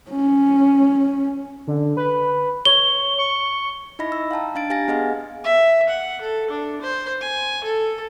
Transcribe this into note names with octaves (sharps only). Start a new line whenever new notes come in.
C#4
D3
B4
C#5 G7
C#6
D#4 E4 D#5 B5 A#6
E6
F5 G5 A5 A#5
D4 F5 A6 D7
G4 F5 G#5 A6 A#6
B3 G#4 D#5 F5 F#5 G#5
E5
F#5
A4
D4
C5
G#5
A4